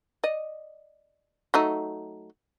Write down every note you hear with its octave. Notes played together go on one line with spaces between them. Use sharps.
D5 D#5
F#3 A3 D#4